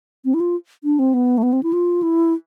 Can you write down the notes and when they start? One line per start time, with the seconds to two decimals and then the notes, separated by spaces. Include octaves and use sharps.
0.25 C4
0.34 E4
0.40 F4
0.84 D4
0.99 C4
1.14 B3
1.38 A3
1.43 B3
1.53 C4
1.63 E4
1.73 F4
2.02 E4